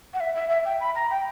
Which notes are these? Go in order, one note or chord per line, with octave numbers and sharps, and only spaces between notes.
F#5
E5
E5
E5
G5
B5
A#5
G5